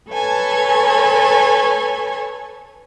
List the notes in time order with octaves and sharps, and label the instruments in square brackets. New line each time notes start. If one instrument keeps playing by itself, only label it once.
[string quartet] A4 B4 C#5 G#5 A5